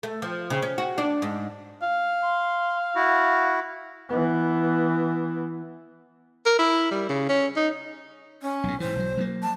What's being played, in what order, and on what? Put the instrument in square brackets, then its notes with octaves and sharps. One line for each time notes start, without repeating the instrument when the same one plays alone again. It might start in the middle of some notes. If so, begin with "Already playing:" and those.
[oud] A3
F3
C#3
C#4
F#4
D4
G#2
[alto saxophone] F5
[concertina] C6
E4 F#4
[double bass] E3 B3
[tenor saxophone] A#4
E4
G3
C#3
C#4
D#4
[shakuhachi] C#4
[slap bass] B1 A2
[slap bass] G#2 E3 [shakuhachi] C5
[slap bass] B1 F#3
F#3 A3 A#3
[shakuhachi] A5